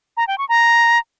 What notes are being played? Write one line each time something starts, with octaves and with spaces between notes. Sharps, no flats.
A#5
G5
C#6
A#5